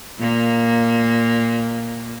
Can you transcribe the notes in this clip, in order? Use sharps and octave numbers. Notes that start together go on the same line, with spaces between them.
A#2 A#3